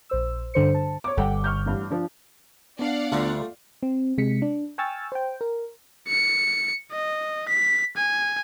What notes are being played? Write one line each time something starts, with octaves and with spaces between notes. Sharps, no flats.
A#1 C5 E6
G2 D3 C5 C#7
A5
C#5 D6
G1 G3 A4 F#5 G5
C#6 F6 G6
A1 G2
F3 D4
B3 D4 D5 F5 F#5
D2 D3 G3 A3 F4
C4
C3 G#3 B6 C#7
D4
G5 G#5 C#6 E6 F6 A6
C5 G5
A#4
C#7
D#5
B6
G#5